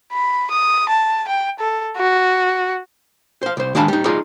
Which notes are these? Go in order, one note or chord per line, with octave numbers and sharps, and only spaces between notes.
B5
D#6
A5
G5
A4
F#4
C5 F5
C2 C5
D#3 G#3 D4 F5 A5 B5
G3 D#4
D#4 F4 G#4 D5 D#5